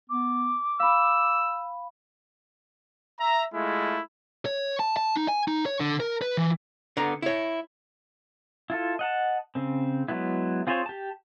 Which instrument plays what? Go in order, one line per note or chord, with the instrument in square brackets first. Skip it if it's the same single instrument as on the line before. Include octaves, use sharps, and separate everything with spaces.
[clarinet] B3 [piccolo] D6
[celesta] F5 B5 [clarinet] E6
[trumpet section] E5 A#5
G#3 A3 E4 F4
[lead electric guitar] C#5
A5
A5
D#4
G#5
D#4
C#5
D3
A#4
B4
E3
[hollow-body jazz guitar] D3 B3 A#5
E4 C#5
[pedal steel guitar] E4 F4 A4
D#5 F#5 A5
C#3 C4
F#3 G#3 B3 E4
C4 F4 G#4 C5 C#5
G4 A5